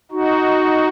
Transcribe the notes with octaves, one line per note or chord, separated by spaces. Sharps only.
D#4 F#4